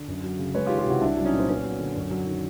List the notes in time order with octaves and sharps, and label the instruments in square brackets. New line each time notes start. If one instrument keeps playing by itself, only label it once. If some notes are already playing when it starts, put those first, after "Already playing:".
Already playing: [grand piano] D3
F#2
F#3
C#3
G#3 B4 C#5
F4 G4
D#3
F4 G4
C3 E4 F#4
C2 D4 E4
F#3
C#4 D#4
A#2
C4
B3 C#4
F#3
D3
F#2
F#3
D#3